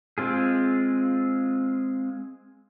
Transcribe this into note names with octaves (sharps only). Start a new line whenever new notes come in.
G#3 C4 F4 G#4